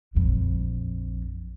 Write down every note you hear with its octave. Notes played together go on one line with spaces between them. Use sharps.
A#1 F2